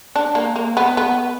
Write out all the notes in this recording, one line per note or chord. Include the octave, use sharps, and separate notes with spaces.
D4
A#3
A#3
B3
B3